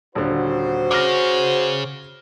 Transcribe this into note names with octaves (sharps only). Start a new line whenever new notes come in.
D#1 D3 F#4 C5
G#4 C#5 D6 F6 A#6